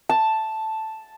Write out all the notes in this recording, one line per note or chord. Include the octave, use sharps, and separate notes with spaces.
A5